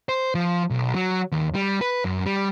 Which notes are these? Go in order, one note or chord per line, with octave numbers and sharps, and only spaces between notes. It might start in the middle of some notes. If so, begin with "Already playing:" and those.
C5
F3
B1
F#3
D#2
G3
B4
F#2
G3